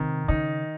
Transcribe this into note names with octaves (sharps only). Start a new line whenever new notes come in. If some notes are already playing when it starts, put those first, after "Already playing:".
Already playing: C3 D#3
C#3 D#4